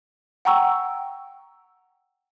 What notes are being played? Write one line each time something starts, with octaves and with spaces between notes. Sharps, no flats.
F#5 G5 A#5 C#6 E6